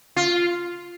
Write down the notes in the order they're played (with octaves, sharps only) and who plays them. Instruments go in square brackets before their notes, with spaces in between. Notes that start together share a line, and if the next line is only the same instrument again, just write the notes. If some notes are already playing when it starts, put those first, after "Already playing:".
[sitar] F4